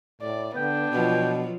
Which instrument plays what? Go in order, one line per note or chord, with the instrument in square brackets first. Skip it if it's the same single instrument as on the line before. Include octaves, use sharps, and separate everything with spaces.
[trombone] A2 [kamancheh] D5
[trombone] D3 [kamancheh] B3 D4 [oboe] G5
[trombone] B2 [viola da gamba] F3 F#3 F4